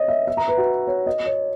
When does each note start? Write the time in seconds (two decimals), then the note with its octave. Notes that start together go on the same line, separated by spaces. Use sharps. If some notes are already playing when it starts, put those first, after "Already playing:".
Already playing: C#5 D#5
0.08 E5
0.27 E5
0.37 A#5
0.48 B4
0.58 F#4
0.87 C#5
1.06 D#5
1.26 C#5